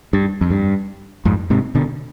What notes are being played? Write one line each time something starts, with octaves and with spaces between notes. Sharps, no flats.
G2
F2
G2
F2 G#2
G#2 C3
B2 D3